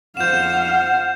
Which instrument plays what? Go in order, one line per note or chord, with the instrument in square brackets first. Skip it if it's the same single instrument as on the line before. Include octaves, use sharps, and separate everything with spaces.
[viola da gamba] F2 F3 C5 [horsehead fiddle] F5 [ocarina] F#5 [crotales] G6 E7